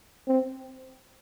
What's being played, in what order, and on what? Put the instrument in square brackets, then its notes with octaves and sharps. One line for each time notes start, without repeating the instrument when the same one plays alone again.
[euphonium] C4